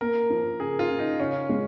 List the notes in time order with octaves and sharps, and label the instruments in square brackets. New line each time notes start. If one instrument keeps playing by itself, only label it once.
[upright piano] A#3 [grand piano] A#4
[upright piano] F3
[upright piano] C#3 [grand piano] G#4
[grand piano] F4
[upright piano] C#3
[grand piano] D#4
[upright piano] C#3 [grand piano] C#4
[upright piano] G#3